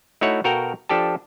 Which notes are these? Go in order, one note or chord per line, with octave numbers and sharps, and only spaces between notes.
A3 D#4 E4 F#4 C#5 F#5
B2 F#4 A4 A#4 F5 G5
F3 D4 G4 A4 A5